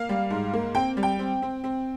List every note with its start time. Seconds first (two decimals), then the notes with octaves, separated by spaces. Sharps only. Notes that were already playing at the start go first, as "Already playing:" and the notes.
Already playing: A#3 F5
0.09 G3
0.30 G#2
0.53 A#3
0.75 C4 G5
0.97 G3
1.03 G5
1.19 C4
1.42 C4
1.64 C4